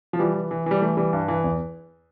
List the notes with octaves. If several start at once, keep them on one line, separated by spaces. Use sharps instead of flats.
F3
E3 G3
E3
E3
E3 G3
E3 A3
E3 G3
G2
E3
E2